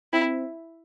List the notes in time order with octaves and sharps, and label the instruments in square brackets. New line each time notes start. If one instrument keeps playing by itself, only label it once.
[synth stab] C4 [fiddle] E4